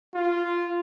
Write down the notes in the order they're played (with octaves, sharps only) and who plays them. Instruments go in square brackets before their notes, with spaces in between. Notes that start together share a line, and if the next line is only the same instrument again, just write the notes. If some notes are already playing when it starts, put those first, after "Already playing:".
[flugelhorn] F4